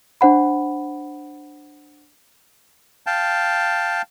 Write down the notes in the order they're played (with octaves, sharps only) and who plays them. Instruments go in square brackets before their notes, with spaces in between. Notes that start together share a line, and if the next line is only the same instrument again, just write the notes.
[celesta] D4 C5 F#5 B5
[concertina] F5 G5 A5